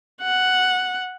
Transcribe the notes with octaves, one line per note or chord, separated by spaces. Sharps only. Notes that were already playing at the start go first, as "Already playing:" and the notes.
F#5